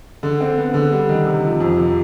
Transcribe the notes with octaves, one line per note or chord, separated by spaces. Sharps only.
D3
C4
B3
D3
G3
D#3
C3
F3
F2
C3